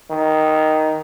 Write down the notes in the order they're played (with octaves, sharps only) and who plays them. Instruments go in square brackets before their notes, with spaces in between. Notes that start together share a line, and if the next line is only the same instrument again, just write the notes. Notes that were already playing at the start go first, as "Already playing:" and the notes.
[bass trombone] D#3